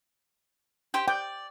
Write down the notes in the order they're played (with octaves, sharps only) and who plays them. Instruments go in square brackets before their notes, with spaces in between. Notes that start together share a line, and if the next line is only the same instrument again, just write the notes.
[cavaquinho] G4 C5 G5
[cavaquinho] D5 [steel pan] G5